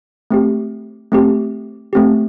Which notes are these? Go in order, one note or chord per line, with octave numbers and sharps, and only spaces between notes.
A3 C4 G4
A3 C4 G4
A3 C4 G4